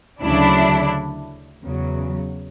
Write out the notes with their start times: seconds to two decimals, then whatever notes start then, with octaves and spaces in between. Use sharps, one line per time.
0.21 D2 C#3 F#3 D4 E4
1.62 E2 C#3 F#3